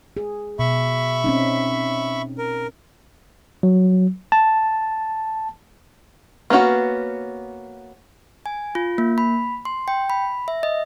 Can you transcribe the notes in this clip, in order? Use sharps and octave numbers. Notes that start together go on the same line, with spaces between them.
G#4
B2 E5 B5 C#6
C4 C#4 D#4
A#4
F#3
A5
A#3 B3 C#4 F#4
G#5
F4
A#3
B5
C6
G5
B5
E5
D#5